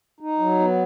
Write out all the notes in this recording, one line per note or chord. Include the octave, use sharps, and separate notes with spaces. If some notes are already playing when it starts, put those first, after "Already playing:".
D#4
F#3
B3